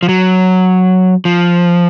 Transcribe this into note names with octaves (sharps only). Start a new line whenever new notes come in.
F3
F#3
F3